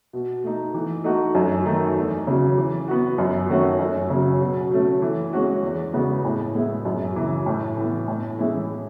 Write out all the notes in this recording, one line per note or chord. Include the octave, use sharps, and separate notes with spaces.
B2
A3 D#4
E3
A3 D#4 F#4
F#2
D#3 A3 D#4
E2
C#3 F#3
E3
B3 F#4
F#2
D#3 A3 C#4 F#4
F#2
C#3 F#3
B2
F#3 A3 C#4
E3
G#3 C#4 F#4
E2
C#3 G#3 B3 F#4
A2
G#3 B3 E4
F#2
C#3 E3
A2
E3 B3
A2
E3 G#3 C#4 E4